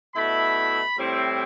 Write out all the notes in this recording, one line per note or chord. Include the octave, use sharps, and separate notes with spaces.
B2 A3 E4 B5
A2 G3 C4 E4